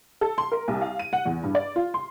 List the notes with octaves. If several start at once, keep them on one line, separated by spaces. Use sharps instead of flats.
A4
C6
A#4
C2
F5
D#7
F#5
E2
G2
D5
F4
C6